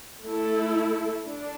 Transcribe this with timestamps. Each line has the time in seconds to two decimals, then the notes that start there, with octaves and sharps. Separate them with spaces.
0.25 A3 E4 A4
1.27 D4